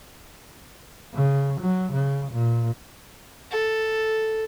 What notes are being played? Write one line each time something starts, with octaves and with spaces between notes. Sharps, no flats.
C#3
F#3
C#3
A#2
A4